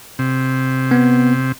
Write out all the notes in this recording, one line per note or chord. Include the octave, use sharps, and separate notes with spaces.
C3
B3